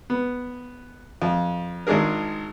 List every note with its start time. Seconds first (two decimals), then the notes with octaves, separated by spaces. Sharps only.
0.10 B3
1.22 F2
1.87 G#1 G#3 D4 G#4 A#4